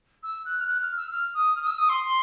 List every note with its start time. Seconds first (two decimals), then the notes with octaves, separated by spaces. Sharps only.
0.23 E6
0.45 F#6
0.61 F6
0.67 F#6
0.82 F6
0.97 E6
1.12 F6
1.34 D#6
1.56 F6
1.62 D#6
1.67 E6
1.78 D#6
1.89 C6